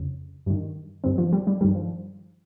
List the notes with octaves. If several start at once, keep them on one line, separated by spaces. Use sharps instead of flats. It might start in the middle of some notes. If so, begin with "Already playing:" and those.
Already playing: F2 C#3
G2 D#3
G2 D#3 C4
F3
G3
G3
G2 D#3 G3
F3